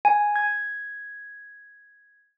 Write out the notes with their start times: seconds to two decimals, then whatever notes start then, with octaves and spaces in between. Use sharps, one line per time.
0.05 G#5
0.36 G#6